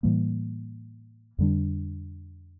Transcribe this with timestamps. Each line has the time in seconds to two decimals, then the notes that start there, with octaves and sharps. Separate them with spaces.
0.03 A2 E3 G3 A#3
1.39 F2 D3 G3 D4